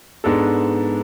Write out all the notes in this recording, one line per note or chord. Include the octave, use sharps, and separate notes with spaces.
G#2 G#3 B3 D4 A4